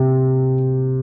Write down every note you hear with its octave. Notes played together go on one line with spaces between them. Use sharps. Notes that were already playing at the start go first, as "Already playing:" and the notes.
Already playing: C3